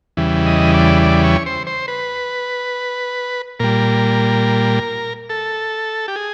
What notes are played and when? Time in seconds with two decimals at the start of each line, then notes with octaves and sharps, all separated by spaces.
0.17 E2 C#3 E3 G3
0.46 D#5
0.74 D5
1.03 D5
1.24 C#5
1.46 C5
1.67 C5
1.88 B4
3.60 A#2 G3 A#4
5.30 A4
6.08 G4
6.16 G#4